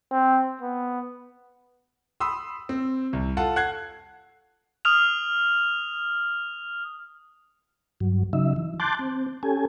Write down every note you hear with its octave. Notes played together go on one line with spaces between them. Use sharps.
C4
B3
B5 C6 D#6 E6
C4
C2
F4 A4 F#5 A5
F#5 F#6 G#6 C7
D#6 F6 F7
G2 F#3
C#3 F#3 D#4 E5
E3
A5 C6 D6 F#6 G6 A6
C4
C#4 G4 A4 G#5